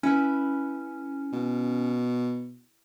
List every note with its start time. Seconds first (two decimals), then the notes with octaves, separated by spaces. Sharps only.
0.03 C#4 E4 B4
1.33 B2